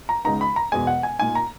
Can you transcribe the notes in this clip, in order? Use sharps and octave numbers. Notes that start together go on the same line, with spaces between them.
A#5
C#2 C#3 G#3 B3 D#4 A#5
B5
A#5
E1 E2 B2 G#3 G#5
F#5
G#5
A#2 A#3 D#4 G#5
A#5